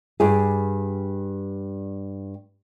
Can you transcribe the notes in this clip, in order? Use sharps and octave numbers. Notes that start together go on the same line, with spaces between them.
G2 G3 G#4